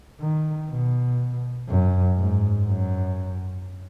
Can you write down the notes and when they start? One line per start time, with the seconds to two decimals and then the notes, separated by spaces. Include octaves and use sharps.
0.20 D#3
0.69 B2
1.69 F#2
2.18 G#2
2.67 F#2